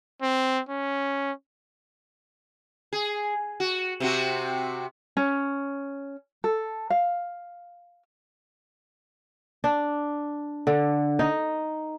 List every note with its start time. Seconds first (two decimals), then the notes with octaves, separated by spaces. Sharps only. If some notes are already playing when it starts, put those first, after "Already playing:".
0.22 C4
0.69 C#4
2.93 G#4
3.60 F#4
4.00 C3 C4 F#4
5.17 C#4
6.44 A4
6.90 F5
9.64 D4
10.67 D3
11.19 D#4